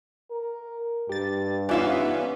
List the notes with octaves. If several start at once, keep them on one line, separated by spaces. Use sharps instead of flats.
A#4
G2 G4 A6
E3 B3 C#4 D#4 F4 D5 E5 F5